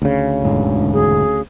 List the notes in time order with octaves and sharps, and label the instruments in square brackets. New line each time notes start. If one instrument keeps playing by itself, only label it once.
[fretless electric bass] D2 C#3
[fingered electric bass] E1 G#2 D3
[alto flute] G#4